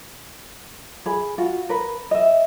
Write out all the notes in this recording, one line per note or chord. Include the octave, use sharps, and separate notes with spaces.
G#4 B5
F4 F#4
A#4 B4
D#5 E5